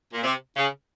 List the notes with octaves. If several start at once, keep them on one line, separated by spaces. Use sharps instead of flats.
A#2
C3
C#3